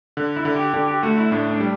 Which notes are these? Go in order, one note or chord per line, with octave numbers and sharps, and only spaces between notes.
D3
E4
D3
G4
D3 G4
G4
A3 F#4
E4
A2 D4
D4
G3